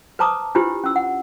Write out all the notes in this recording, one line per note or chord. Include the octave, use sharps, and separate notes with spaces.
B4 C5 A5 A#5 D6 D#6
D4 E4 F4 G4 B4 C5
C#4 E6
F#5